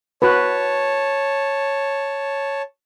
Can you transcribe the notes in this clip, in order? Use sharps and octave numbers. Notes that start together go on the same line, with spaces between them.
F#4 B4 C#5 A5